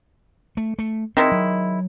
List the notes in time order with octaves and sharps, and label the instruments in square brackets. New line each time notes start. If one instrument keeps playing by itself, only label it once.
[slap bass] A3
A3
[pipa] D#3 G#3 E4 [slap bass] C4
[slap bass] F#3